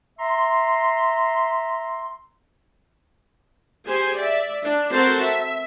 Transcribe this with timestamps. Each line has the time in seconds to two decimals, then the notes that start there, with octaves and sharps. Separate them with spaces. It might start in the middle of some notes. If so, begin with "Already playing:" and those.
0.20 E5 A#5 C6
3.86 G4 G#4 C5 G#5
4.17 D5 E5
4.62 D4
4.92 C4 F#4 A4 A#4 C5 A5
5.22 E5